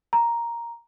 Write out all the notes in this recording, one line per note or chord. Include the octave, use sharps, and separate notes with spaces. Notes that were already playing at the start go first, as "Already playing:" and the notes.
A#5